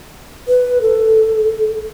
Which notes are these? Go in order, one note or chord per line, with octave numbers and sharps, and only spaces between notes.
B4
A4